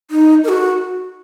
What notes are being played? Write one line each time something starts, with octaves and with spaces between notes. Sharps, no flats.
D#4
A#4
F#4